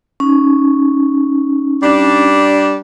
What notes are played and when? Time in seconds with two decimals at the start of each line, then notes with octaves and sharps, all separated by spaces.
0.20 C#4 D#4
1.83 G3 D4